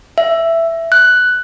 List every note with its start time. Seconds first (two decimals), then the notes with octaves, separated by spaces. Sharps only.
0.18 E5
0.92 F#6